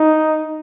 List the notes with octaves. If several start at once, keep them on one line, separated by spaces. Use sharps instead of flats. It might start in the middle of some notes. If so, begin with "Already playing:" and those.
Already playing: D#4